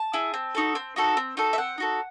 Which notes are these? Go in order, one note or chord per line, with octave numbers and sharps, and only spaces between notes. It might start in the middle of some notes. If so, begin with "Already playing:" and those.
Already playing: A5
E4 G#4
C4
D#4 F#4 A4
C4
D#4 F#4 A4
C4
D#4 F#4 A4
E5
C4 F#5
D#4 F#4 A4